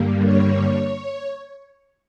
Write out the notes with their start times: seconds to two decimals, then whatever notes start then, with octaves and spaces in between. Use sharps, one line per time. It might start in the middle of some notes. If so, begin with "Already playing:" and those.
Already playing: G2 D3 G3 A#3
0.24 C#5